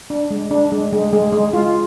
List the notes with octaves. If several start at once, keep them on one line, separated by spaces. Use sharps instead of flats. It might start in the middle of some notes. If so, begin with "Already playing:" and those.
D4
G#3
D4
G#3
G#3
G#3
G#3
F4